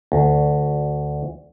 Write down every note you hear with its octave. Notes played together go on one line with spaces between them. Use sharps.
D2